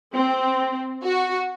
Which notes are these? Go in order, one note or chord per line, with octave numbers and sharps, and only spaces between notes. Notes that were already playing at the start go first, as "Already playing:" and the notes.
C4
F#4